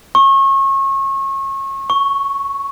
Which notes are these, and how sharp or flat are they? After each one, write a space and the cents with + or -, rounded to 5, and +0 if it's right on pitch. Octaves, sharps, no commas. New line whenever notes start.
C#6 -30
C#6 +0